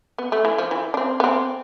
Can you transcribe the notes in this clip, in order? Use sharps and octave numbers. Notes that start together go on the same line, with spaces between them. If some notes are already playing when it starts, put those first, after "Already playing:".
B3
A3
E3
F3
E3
D4
C4
B3
C4